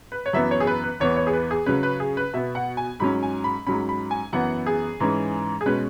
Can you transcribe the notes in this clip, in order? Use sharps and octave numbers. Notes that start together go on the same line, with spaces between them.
B4
C#5
F#2 E3 B3 E5
C#5
G#4
B4
B4
E2 E3 B3 C#5
C#5
G#4
B4
G#4
C#3 F#3 C#4 B4
B4
G#4
B4
B2 B3 E5
F#5
G#5
G#2 F#3 C#4 B5
G#5
B5
G#2 F#3 C#4 B5
B5
G#5
F#2 E3 B3 F#5
G#4
G#2 E3 C#4
G#4
B2 G#3 C#4 B4